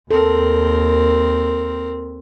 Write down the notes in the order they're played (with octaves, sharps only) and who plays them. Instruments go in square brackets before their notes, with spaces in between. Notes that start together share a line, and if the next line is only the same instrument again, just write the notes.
[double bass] D#2 [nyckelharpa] C4 A#4 [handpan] A4